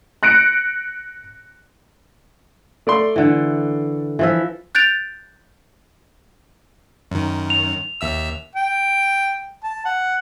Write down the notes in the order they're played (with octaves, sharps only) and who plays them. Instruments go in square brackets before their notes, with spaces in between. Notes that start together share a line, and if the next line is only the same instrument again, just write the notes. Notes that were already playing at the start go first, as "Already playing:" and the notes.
[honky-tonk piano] F#6 A#6 C#7 D7
[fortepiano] A3 D5 C6
[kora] D3 E3
E3 F3 E5
[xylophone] F#6 G6 A6 D7 F7
[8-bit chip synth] F#2 D#3
[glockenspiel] F7
[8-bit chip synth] D#2 E5 E6
[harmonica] G5
A5
F#5